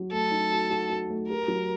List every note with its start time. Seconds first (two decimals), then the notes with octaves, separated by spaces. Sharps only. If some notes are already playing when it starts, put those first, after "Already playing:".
Already playing: F#3
0.12 A3 A4
0.31 D#4
0.52 F#4
0.70 F#4
0.90 F#4
1.10 A3
1.29 G4 A#4
1.48 F#3